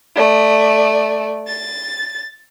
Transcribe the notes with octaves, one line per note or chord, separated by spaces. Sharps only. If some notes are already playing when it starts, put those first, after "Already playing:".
A3 D5
A6